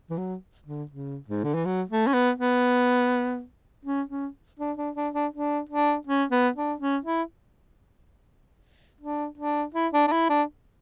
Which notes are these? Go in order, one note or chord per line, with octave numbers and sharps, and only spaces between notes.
E3
F#3
D3
C#3
G#2
D3
E3
F#3
A3
C#4
B3
B3
C#4
C#4
D4
D4
D4
D4
D4
D4
C#4
B3
D4
C#4
E4
D4
D4
E4
D4
D4
E4
D4